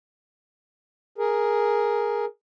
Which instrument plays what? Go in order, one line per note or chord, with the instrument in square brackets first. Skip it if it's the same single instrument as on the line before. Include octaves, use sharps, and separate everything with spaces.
[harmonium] G#4 A#4